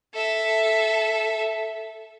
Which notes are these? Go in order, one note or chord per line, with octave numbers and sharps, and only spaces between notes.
A4 E5